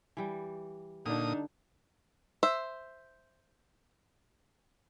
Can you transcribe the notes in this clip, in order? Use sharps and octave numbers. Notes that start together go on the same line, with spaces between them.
E3 G3
A#2 D3 D4 D#4 D#6
C5 E5